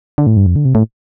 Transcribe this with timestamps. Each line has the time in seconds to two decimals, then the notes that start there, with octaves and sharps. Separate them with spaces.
0.18 D3
0.27 A2
0.37 G2
0.46 F2
0.56 D3
0.65 C3
0.75 A2